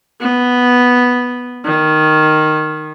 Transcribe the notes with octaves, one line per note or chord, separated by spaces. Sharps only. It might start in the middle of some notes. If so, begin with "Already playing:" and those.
B3
D#3